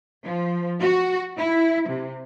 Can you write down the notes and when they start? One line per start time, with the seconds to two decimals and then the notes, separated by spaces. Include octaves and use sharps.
0.25 F3
0.80 F#4
1.37 E4
1.89 C3